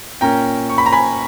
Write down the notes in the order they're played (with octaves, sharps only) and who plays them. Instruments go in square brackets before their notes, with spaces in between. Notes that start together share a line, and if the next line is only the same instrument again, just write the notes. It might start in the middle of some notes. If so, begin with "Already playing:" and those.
[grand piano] A#2 A#3 C#4 G5 A#5
C#6
B5
A#5
G#5 B5